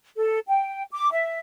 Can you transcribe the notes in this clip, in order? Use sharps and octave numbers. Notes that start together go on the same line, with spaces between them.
A4
G5
D6
E5